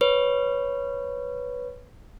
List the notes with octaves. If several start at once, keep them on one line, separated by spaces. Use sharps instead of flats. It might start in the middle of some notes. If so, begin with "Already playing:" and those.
B4 C#5